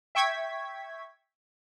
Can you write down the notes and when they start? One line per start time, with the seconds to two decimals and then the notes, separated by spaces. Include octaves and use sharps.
0.15 E5 G5 C#6 G#6 B6